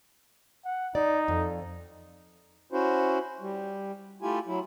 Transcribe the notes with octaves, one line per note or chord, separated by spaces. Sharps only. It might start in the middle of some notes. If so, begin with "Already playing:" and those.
F#5
D#4 D5
F2
C#4 E4 F#4 C5
G3
A3 E4 F4 G4 G#5
F#3 E4